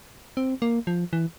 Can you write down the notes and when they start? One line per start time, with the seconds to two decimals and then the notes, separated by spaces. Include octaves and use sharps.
0.37 C4
0.62 A#3
0.87 F3
1.13 E3